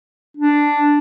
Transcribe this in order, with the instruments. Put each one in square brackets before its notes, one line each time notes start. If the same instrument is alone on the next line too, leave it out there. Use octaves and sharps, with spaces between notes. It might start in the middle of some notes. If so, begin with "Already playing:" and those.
[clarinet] D4